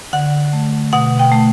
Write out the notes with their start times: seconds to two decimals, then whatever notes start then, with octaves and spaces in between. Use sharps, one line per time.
0.13 D3 F#5
0.53 A3
0.93 B2 F#5
1.19 G5
1.32 A3